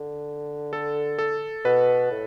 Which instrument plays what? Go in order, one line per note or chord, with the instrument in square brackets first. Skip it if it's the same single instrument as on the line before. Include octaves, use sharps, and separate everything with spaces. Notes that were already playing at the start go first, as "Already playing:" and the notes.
Already playing: [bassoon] D3
[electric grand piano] A4
A4
[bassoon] B2 [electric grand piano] B4
[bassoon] A2